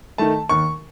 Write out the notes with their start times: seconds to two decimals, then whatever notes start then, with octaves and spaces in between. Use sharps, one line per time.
0.18 D#3 A3 A5
0.49 D#2 C#6